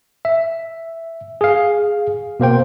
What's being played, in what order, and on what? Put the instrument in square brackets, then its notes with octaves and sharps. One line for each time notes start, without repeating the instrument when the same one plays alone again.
[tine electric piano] E5
G#4 F5
B2 A#3 C5 G5